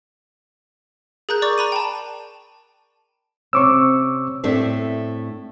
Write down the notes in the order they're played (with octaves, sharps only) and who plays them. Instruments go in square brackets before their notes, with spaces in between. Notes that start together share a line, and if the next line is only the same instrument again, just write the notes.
[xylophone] G#4 A#4 A#5 F#6 G6
D5 C#6 D6 A6
A#5 B5 D#7
G5 A5
[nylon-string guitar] C3 C4 C#4 [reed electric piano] C#6 D6 E6
[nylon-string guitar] A2 A3 C4 D4 E5